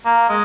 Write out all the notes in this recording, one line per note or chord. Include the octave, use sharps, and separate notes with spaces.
A#3
G#3